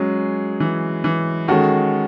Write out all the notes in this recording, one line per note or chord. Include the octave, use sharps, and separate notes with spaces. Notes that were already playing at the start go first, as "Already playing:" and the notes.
Already playing: F#3 G#3 C#4 G#4
E3
E3
D#3 G#3 C#4 F#4 A4